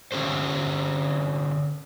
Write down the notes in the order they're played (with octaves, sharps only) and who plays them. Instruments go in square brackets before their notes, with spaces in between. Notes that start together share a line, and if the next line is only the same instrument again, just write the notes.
[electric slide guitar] D3 C#4 G4 A4 C5